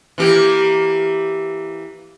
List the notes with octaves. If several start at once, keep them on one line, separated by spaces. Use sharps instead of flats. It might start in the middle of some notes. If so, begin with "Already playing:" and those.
E3 A#3 G4